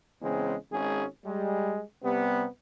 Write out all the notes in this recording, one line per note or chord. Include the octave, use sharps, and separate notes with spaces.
E2 C#3 G#3 C4
G#1 G#3 C#4 G#4
G3 G#3
C3 G3 B3